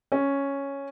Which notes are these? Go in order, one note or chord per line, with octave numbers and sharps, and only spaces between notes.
C#4